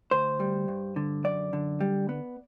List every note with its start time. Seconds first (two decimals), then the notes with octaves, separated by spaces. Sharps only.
0.11 D2 C5
0.40 G3
0.68 G2
0.96 D3
1.24 F#2 D5
1.53 D3
1.81 G3
2.09 B3